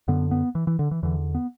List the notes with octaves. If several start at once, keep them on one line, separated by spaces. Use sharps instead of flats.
F#2 D3 B3
B3
E3
E3
D3
E3
E2 D3 E3
B3